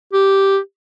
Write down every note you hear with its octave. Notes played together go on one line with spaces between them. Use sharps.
G4